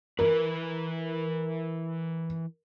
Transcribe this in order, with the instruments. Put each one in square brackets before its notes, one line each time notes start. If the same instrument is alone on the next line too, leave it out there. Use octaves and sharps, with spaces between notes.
[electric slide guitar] E3 B4 [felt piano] A#4